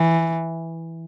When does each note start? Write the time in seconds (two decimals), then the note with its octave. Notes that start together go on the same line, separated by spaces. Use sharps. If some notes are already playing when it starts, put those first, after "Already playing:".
Already playing: E3